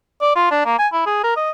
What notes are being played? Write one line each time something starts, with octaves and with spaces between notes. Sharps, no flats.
D5
F4
D4
A#3
G#5
E4
G#4
A#4
D#5